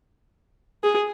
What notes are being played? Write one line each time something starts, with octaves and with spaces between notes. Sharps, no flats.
G#4